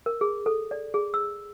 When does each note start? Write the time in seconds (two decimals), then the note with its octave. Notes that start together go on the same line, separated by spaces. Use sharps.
0.06 A#4
0.21 G#4
0.46 A4
0.71 D5
0.94 G#4
1.14 E6